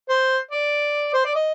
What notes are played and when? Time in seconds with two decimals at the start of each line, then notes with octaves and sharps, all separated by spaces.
0.09 C5
0.51 D5
1.14 C5
1.25 D5
1.35 D#5